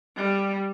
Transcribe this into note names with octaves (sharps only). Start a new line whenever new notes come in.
G3